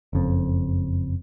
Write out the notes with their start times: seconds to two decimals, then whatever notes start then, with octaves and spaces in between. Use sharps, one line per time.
0.13 F#1 F2